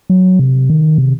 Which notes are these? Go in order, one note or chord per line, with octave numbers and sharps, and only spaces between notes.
F#3
C3
D#3
C3